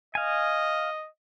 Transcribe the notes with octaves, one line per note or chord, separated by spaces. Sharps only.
D#5 F5 G#5